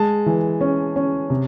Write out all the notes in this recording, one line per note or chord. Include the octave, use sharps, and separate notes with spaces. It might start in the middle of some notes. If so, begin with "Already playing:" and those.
Already playing: G#3 A5
E3
C#4
C#4
C3